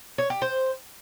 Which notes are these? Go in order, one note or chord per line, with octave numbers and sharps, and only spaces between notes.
C#5
G4
C5